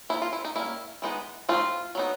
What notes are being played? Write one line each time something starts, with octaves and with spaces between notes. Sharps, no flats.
F3 A#3 D#4 E4
F4
E4
D#4
G3 A#3 C#4 E4
E3 G#3 B3 D#4
F3 A3 C4 D#4 F4
F#3 B3 D#4